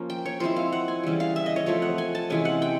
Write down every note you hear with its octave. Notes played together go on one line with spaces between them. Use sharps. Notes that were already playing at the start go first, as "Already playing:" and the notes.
Already playing: F3 A#3 C#4
G5
C#5
F3 G#3 C4 E4 C5
F5
F#5
G#5
C#3 E3 G3
F5
E5
D#5
C#5
F3 A3 C4 C#5
F#5
G#5
A5
C3 E3 G#3 C#4 G#5
F#5
G5